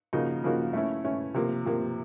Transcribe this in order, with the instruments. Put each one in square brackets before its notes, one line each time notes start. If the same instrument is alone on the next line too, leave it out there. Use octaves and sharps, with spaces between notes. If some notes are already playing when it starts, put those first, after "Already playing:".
[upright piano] C#3 F3 A#3 D#4 F#4
C#3 F3 A#3 D#4 F#4
A3 C#4 E4
A3 C#4 E4
C3 F3 A#3
C3 F3 A#3